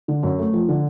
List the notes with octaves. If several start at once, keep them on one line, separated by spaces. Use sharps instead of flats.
D3
F#2
A3
F3
D3